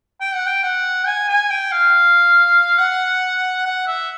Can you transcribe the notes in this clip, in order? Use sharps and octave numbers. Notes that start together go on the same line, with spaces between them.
G5
F#5
G5
F#5
G#5
G#5
G5
F5
F#5
F#5
E5